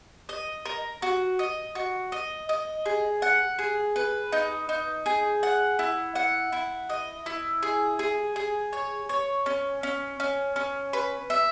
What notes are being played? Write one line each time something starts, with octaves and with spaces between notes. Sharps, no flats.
D#5
A#4
F#4
D#5
F#4
D#5
D#5
G#4
F#5
G#4
B4
D#4
D#4
G#4
F#5
E4
F#5
E4
D#5
E4
G#4
G#4
G#4
C#5
C#5
C#4
C#4
C#4
C#4
B4
E5